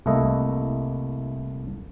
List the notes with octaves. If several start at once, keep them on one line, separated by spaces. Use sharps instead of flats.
C2 A3 A#3 E4 D#5